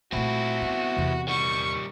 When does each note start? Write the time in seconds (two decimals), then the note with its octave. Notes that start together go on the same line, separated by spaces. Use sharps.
0.12 A#2 A3 C4 E4 F#4
0.62 B3
0.96 E2 C3
1.28 D#3 G3 C#6